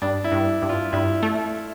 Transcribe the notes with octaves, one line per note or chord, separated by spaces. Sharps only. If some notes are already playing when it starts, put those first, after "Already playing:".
G2 D4
E4
G2
G2
F4
G2 E4
A3